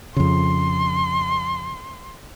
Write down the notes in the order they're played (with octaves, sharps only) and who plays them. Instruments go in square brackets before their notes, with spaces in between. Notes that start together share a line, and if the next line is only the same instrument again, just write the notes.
[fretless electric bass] F2 C#3 [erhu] C6